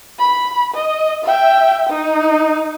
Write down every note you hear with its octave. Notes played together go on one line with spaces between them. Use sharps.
B5
D#5
E5 G5
D#4